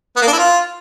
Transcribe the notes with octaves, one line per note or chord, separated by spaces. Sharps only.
B3
A#3
D4
E4
F4